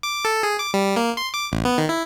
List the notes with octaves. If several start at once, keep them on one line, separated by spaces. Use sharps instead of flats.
D6
A4
G#4
D6
G3
A#3
C6
D6
A1
B3
D#3
E4